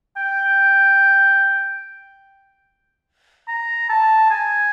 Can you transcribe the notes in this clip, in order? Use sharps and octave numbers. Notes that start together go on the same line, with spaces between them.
G5
A#5
A5
G#5